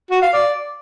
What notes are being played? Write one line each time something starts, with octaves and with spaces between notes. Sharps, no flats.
F#4
F5
D5